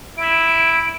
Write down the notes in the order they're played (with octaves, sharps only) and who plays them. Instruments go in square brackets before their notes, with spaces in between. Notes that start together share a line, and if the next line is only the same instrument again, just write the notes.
[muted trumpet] E4 [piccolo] D7